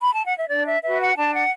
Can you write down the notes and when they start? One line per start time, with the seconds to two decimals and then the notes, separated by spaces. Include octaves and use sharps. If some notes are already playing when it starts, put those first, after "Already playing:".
0.01 B5
0.13 A5
0.25 F#5
0.37 E5
0.49 D4 D5
0.66 E5
0.83 F#4 B4 E5
1.00 F#5
1.16 D4 A5
1.33 F#5